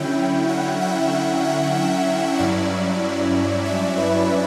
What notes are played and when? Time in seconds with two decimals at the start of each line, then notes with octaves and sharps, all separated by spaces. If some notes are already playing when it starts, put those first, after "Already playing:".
Already playing: D3 F#3 C#4 E4 G5
0.48 F#5
0.81 E5
1.12 E5
1.44 F#5
1.75 E5
2.38 G2 F#3 C#4 E4 D5
3.65 E5
3.97 B4